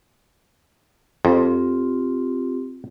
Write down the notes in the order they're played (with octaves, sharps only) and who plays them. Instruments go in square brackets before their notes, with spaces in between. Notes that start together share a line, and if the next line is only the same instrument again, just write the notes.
[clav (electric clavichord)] F2 [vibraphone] C4 F4 G4